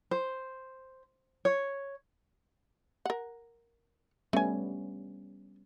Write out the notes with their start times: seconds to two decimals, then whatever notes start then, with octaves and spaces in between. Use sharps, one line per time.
0.11 C5
1.45 C#5
3.05 A#4 F#5
4.33 G3 A3 B3 C#4 G#5